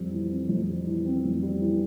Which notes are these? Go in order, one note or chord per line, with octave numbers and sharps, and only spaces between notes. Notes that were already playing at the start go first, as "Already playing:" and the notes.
Already playing: F2 G3
E3
C4
F2
G3
E3
C4
F2
G3
E3